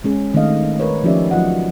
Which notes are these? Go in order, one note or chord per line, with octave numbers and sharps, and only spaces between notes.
G#3 C#4 G#4
D#3 A3 C4 D4 D#5 F5
A#4 B4 C#5
F3 C#4 D#4 G4 D5 E5
F#3 F4 D#5 F#5